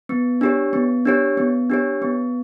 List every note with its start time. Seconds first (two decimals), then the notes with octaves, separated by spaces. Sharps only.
0.09 B3
0.41 D4 G4 C#5
0.73 B3
1.05 D4 G4 C#5
1.37 B3
1.70 D4 G4 C#5
2.02 B3